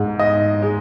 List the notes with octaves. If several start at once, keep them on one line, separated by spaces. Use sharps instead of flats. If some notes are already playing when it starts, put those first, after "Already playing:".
Already playing: G#2
D#5
G#3